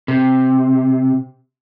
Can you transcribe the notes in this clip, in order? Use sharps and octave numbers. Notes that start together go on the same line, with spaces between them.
C3